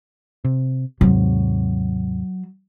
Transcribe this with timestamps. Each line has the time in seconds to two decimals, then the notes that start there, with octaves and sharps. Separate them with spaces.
0.45 C3
1.01 D#2 G#2 C3 F#3